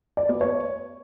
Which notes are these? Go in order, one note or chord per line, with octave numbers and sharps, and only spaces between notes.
D5
B3
C#5